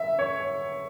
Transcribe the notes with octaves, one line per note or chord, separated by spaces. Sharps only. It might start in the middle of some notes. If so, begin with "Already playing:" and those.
Already playing: E5
C#5